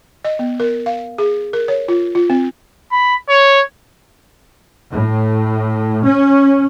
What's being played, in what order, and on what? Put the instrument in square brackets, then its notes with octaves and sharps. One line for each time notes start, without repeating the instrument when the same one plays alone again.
[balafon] D#5
B3
A#4
F5
G#4
A#4
C#5
F4
F4
C4
[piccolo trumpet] B5
C#5
[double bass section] A2
C#4